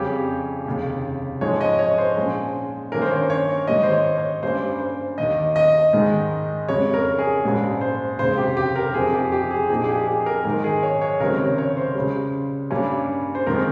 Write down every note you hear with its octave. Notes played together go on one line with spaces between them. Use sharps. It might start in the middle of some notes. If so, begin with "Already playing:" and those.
Already playing: F2 C#3 G3 C#4 G4
F1 D#2 C#3
G#2 F3 G#3 D#4 C#5
D#5
C#5
C5
A#1 A#2 G#3 C#4
G2 D#3 A#3 C#4 A#4
C5
C#5
C#5
G#2 D#3 G3 A#3 D#5
C5
C#5
C#5
G2 G3 A#3 C#4 C5
C5
D#2 D#3 A#3 D#5
D#5
G#2 D#3 G#3 D#4
F2 C#3 G3 C#5
A#4
G#4
A#1 G#2 G3 C#4
C5
F1 D#2 C#3 C5
G4
G4
A#4
F1 F2 C3 F3 C4 G#4
G4
G4
G#4
A#1 A#2 F3 A#3 D#4 G#4
G#4
G4
G#4
A#4
G#2 D#3 G#3 D#4 A#4
G#4
C#5
C#5
C#2 C3 D#3 G3 C4 A#4
C#5
C#5
C5
C#2 C#3 G3
G2 G3 A#3 C#4
C5
F2 D#3 G#3 A#4